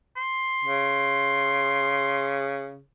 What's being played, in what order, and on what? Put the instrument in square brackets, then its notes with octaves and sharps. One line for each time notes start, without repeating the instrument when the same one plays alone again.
[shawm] C6
[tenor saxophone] C#3